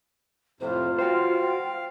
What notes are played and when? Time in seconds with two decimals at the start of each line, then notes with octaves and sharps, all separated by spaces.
0.60 F2 A2 C3 F4 C5
0.99 F#4 C5 F5 G5